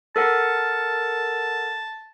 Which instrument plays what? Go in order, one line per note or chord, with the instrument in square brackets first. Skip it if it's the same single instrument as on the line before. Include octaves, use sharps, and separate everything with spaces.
[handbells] A4 A#4 F#5 [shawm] A5